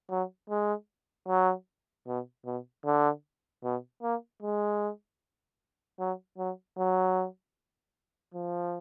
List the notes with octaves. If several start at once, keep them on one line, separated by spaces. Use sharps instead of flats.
F#3
G#3
F#3
B2
B2
D3
B2
A#3
G#3
F#3
F#3
F#3
F3